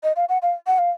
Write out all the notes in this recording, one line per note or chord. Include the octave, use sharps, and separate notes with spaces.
D#5
F5
F#5
F5
F#5
F5